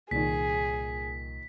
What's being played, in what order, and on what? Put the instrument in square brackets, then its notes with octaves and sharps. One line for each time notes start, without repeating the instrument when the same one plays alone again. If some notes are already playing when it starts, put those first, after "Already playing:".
[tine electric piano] C2 [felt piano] A#2 D#3 [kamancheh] G#4 [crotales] B6